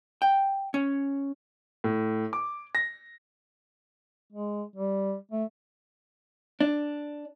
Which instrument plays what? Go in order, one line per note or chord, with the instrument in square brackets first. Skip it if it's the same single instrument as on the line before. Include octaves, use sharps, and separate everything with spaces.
[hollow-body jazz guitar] G5
C#4
[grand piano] A2
D6
A#6
[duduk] G#3
G3
A3
[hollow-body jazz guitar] D4